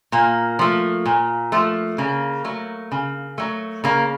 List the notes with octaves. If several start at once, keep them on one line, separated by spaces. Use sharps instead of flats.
A#2 A#3
F3 A3
A#2
F3 A3
C#3 A#3
F#3 A3
C#3
F#3 A3
C#3 A#3